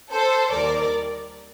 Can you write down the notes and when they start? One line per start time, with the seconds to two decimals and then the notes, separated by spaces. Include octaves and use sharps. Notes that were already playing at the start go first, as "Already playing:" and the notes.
0.12 A4 C5
0.51 D#2 D#3 G3 A#4 D5